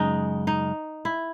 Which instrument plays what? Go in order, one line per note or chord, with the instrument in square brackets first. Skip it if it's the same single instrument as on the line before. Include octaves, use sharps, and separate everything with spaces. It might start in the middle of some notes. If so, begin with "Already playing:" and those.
Already playing: [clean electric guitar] F#2 C#3 G#3 [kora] D#4
[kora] D#4
E4